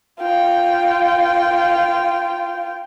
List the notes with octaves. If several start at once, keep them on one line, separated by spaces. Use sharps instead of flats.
F4 G5